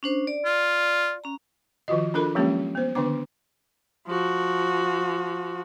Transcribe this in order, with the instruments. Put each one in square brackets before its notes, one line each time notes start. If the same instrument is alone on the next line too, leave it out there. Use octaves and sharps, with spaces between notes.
[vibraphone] C#4 D4 C5
D5
[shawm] F4
[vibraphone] C#4 A#5
[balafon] D#3 F3 F4 F#4 D#5
D4 F4 A4 A#4 B5
F3 F#3 G#3 A#3 C#4 G4
B3 C5
D3 D#3 B3 D4 D6
[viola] F3 F#4